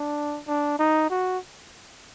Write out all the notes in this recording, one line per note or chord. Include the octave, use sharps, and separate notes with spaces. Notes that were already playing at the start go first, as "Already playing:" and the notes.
Already playing: D4
D4
D#4
F#4